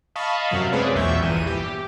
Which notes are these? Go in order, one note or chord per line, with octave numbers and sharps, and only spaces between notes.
D#5 F5 A5 B5 C#6
F#2 C3 F#3 F5
G#3 C4 G#4 B4 C#5 D5
B1 E2 A#2 E5 C#6 G6
G1 E3 D#7
G4